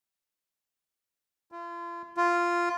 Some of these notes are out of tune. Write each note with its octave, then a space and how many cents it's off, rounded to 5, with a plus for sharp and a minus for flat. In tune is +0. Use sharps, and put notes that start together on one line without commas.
F4 -35
F4 -5